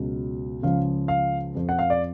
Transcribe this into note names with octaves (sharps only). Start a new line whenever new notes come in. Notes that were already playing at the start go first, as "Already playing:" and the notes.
Already playing: C#2 B2 F#3
C#2 C#3 F3 F5
F5
F2 F3
F#5
F5
D5